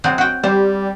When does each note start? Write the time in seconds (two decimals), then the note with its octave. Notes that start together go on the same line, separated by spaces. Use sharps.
0.04 F#3 G#3 C4
0.18 F#4 G5
0.43 G3 C5